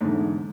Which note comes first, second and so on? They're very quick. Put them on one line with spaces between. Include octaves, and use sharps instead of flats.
G#2 D3 E2